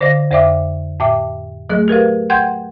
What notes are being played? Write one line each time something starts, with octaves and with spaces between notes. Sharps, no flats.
D3 C5 D5 D#5 F5 A#6
F2 C5 D5 E5 G5 D6
A2 E5 G5 D6
F#3 A3 G#4 D#5
G4 A#4 B4 F5
F#5 G5 C6 G6 G#6